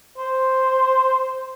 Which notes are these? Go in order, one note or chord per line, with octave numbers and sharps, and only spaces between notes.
C5